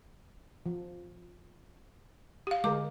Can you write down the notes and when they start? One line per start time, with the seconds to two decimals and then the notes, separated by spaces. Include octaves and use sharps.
0.66 F3
2.47 G4 F5
2.64 D3 G#3 A#4 D6